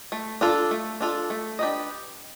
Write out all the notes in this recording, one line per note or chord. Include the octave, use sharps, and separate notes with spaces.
A3
D4 F4 A4
A3
D4 F4 A4
A3
D4 G4 B4 D#5